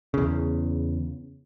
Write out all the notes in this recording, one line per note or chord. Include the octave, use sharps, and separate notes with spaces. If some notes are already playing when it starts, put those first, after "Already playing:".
E2 C#3